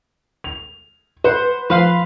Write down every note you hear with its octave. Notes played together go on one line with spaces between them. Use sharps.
F7
B4 C5 F#5
F3 B4 F5 C6